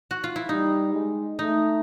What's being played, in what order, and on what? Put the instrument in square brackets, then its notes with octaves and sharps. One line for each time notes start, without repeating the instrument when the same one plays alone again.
[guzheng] F#4
F4
E4
[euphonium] G3 [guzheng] D#4
[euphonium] G#3
[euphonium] A3 [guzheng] D#4